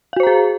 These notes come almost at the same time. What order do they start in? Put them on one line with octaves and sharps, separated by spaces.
F5 F#4 C5 A#5 G#4